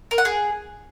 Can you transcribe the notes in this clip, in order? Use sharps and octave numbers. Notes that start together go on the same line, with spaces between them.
A#4
F#5
G#4